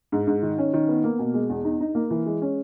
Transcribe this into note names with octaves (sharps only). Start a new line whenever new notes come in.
G#2
G#2
D#3
C#4
D#3
B3
A#3
B2
G#3
E2
D#4
D#4
A#3
E3
G#3
C#4